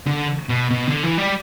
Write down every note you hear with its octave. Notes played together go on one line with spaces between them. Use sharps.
D3
B2
B2
D3
E3
G3